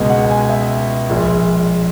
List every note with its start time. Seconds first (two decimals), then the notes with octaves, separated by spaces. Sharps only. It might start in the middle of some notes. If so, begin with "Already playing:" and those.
Already playing: C#2 B2 G#3 D#5
0.10 F#5
0.30 G#5
0.50 E5
1.10 A#1 A#2 G#3